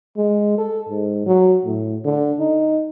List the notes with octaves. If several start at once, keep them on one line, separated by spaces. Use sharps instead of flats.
G#3
A4
G#2
F#3
A2
D3
D#4